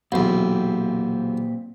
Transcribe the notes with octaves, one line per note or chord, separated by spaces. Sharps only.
B1 E2 A#2 C4 G4